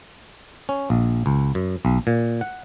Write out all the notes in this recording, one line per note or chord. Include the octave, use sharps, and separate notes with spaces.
C#4
A#1
C#2
F#2
B1
A#2
F#5